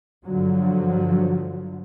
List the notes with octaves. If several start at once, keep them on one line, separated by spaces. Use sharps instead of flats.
G2 D3 F3 F#3